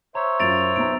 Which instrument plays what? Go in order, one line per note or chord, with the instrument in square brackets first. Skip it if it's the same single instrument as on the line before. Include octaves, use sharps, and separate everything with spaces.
[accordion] C5 E5 C6 [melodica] C#5 [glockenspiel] A#5
[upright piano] F#2 F4 [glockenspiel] A6 D7 F7
[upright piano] B1 B3 A#5 [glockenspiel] D7